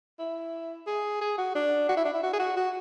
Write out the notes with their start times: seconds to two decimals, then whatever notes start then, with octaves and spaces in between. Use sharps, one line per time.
0.19 E4
0.87 G#4
1.21 G#4
1.38 F#4
1.55 D4
1.89 F#4
1.97 E4
2.05 D4
2.14 E4
2.23 F#4
2.33 G#4
2.40 F#4
2.56 F#4